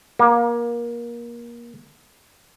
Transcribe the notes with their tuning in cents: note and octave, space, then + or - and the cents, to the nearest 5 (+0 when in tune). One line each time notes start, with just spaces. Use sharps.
A#3 +25